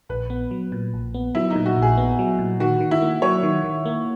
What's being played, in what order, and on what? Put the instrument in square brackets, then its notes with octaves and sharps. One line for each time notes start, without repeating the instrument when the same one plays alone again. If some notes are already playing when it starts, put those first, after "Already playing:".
[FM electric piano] A#1 [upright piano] B4
[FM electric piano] B3
F#3
A#2
A#1
B3
[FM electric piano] F#3 [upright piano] E4
[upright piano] D#4
[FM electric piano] A#2
[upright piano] F#4
[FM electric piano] A#1
[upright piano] G#4
[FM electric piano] B3
F#3
A#2
[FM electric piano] D#3 [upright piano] F#4
[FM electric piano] D#3
[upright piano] E4
[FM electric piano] A#3
[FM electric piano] F#3 [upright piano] C#5
[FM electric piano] D#3
D#3
A#3